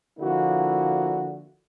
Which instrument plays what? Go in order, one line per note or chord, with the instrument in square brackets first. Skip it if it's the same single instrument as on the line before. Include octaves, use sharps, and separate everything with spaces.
[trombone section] D3 F3 A#3 E4 F#4